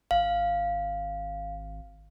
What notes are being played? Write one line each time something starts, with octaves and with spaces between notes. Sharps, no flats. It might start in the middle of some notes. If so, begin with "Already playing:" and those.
G#1 F5